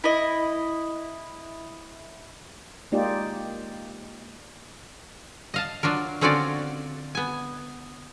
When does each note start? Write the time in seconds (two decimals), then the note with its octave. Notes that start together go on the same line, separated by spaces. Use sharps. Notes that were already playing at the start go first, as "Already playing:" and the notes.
0.04 E4 D#5
2.92 G#3 A#3 D#4 F4 G4 D5
5.54 D#5 F5 A5
5.83 F#3 D4 F4 A#4
6.21 D3 C4 C#4 F4 F#4 D5
7.15 B3 G#5